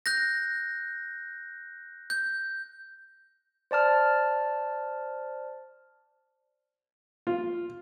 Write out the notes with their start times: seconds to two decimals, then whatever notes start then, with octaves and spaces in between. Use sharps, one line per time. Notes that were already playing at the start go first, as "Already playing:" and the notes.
0.06 F#6 G6 A#6
2.10 G6
3.71 C5 D5 A5 F6
7.27 F4